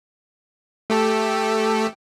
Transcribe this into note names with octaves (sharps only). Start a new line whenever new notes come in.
A3 G4 A4